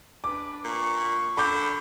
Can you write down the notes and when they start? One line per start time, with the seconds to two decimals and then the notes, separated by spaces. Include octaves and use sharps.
0.24 D4 B4 D6
0.64 A#2 C#6
1.37 D3 B5 D6 G6